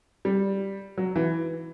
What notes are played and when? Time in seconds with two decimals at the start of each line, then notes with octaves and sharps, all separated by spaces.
0.25 G3
0.97 F#3
1.16 E3